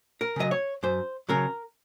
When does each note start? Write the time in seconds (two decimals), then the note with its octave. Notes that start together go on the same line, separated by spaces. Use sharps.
0.21 A#4
0.36 C#3 F#3 D#5
0.51 C#5
0.83 F#2 C5
1.29 C#3 F#3 A#4